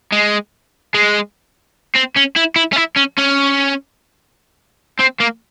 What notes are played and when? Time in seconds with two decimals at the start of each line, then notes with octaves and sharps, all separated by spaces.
0.12 G#3
0.95 G#3
1.95 C4
2.16 C#4
2.36 E4
2.56 E4
2.73 C#4
2.76 E4
2.96 C#4
3.18 C#4
4.99 C4
5.20 A#3